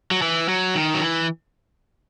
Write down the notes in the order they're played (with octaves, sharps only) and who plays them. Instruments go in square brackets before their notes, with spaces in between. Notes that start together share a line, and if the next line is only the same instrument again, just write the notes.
[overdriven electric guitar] F#3
E3
F#3
D#3
F#3
E3